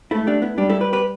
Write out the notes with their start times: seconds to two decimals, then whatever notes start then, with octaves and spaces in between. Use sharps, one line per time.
0.11 A3 E4 A4
0.27 D4 G4
0.42 B3 E4
0.58 G3 D4 G4
0.69 E4 A4
0.80 G4 B4
0.93 G4 B4